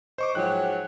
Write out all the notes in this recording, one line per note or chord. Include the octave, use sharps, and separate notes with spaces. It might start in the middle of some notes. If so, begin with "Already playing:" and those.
C5 D#5 C#6 D6
G#2 F3 F#3 G5 F#6